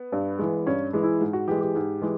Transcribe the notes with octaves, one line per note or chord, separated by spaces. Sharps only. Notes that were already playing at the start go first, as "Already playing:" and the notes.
Already playing: B3
G2
E3 G#3
G2 C#4
E3 G#3
E4
G#2
F#4
E3 G#3 G4
G4
G#2
E3 G#3